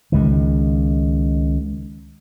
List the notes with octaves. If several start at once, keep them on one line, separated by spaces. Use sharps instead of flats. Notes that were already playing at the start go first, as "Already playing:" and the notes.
C#2 D#3